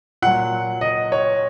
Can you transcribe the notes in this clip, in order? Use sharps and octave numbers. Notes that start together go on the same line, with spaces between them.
A#2 F#3 F#5
D#5
C#5